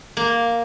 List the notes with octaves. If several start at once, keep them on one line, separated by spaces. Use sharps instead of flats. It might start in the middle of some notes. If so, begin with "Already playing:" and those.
A#3